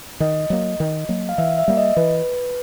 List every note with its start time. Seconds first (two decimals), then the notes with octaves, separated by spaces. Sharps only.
0.20 D#3 D#5
0.50 F#3 A#3
0.80 D#3
1.09 F#3 A#3
1.29 F5
1.38 E3 E5
1.58 E5
1.68 G3 A#3
1.77 D#5
1.96 E3 B4